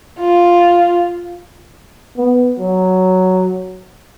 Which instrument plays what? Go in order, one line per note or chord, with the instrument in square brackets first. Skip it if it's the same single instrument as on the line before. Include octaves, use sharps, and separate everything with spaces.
[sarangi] F4
[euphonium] B3
F#3